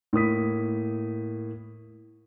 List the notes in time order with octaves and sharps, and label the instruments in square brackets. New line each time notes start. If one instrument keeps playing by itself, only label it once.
[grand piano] A2 A#3 D#6 B6